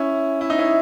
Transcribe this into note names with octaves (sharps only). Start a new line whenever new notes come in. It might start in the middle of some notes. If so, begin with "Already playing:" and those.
Already playing: C#4 E4
E4
D#4
C#4 E4